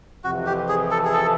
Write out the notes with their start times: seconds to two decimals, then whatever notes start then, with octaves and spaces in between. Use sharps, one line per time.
0.24 F2 C3 E3 F#4
0.46 G4
0.68 G#4
0.91 A4
1.05 G#4
1.13 A4